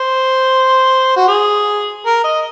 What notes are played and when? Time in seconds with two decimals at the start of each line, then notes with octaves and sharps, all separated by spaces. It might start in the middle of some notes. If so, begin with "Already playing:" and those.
Already playing: C5
1.16 F#4
1.28 G#4
2.06 A#4
2.24 D#5